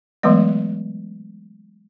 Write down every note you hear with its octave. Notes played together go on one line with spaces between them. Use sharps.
E3 F#3 G#3 A3 B3 D#5